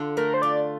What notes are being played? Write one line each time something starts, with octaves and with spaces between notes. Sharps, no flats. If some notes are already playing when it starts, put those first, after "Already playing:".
Already playing: D3 D4 F4
A3 A#4
C5
F4 D5